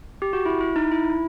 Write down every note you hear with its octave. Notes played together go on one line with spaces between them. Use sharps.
G4
F#4
E4
E4
D#4
E4